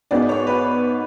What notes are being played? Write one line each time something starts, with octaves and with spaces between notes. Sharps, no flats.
G#2 G#3 B3 D5
D5
C#5
B4